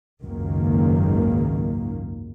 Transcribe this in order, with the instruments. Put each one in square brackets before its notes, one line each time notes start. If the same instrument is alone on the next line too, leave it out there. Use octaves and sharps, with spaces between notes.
[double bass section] G#1 C#2 F#2 D#3 A#3